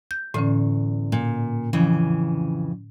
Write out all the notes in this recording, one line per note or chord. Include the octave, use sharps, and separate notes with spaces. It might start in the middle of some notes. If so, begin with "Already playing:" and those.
G6
E2 A2 D3 C#4
A#2
F2 C#3 E3